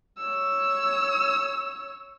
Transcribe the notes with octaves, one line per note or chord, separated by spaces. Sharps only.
C#5 E6